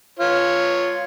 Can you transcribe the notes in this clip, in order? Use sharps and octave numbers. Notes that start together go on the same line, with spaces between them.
F4 C#5